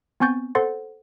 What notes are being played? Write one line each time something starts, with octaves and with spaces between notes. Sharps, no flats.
B3 C4 G#5 C#6 G6 A6
A4 C5 F#5 C6 A6